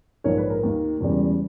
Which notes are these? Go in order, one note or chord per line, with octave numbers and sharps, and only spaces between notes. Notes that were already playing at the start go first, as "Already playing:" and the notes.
A#1 G#2 D#3 A#3 A#4 C#5
B4
A#4
D#2 D#3 A#3 D#4
E1 E2 C#3 G3 C#4